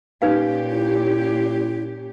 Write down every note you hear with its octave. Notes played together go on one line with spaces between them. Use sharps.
A#2 C#4 D#4 G4 B4 F5
E4